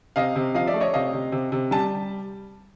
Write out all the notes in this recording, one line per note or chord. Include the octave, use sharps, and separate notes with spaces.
C3 D#5 F5
C3
F3 D#5 F5
D5 E5
A3
C#5 D#5
C3 D#5 F5
C3
C3
C3
G3 A5